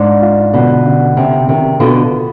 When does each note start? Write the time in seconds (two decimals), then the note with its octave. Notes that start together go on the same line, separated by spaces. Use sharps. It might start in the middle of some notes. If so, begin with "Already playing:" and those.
Already playing: G#2 D4
0.22 F4
0.53 B2 D3
0.85 D3
1.17 C3 C4
1.48 C3 D#3
1.80 B2 D3 F4